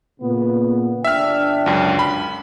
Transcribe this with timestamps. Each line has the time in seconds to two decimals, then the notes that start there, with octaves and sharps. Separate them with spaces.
0.20 A#2 C#3 B3
1.04 G1 D4 E5 G5 F6
1.66 C#2 F#2
1.99 B5